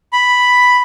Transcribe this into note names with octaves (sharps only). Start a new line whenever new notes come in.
B5